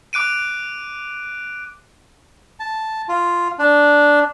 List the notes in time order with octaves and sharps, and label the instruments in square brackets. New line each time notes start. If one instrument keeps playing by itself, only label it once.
[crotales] D6 F#6 D7 D#7
[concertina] A5
F4
D4